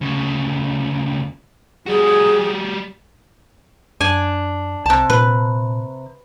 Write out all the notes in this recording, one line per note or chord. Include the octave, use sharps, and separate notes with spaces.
D2 C#3
G3 F#4 G#4
F#2 D4 G#5
C2 C3 A5
A#2 B4